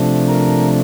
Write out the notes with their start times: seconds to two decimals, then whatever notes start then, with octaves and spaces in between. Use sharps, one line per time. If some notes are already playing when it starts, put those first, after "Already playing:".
Already playing: C3 F3 A3 D4
0.28 A#4